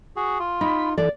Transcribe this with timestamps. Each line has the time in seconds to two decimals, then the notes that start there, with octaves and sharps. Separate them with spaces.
0.16 F#4 G#4
0.39 F4
0.61 D#4 B5
0.98 E3 A4 D5